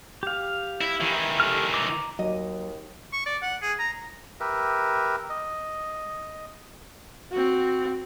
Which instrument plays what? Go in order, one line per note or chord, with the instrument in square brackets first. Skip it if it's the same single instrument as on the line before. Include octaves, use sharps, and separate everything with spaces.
[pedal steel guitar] G4 F5
[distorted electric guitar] E4
D#3 E3
[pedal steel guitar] G4 A4 F6
A#5 D6
[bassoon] D#2 [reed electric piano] F#3 [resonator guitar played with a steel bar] D#5
[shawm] C#6
D5
F#5
G#4
A#5
[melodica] G4 A#4 B4 E5
D#5
[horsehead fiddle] C4 F#4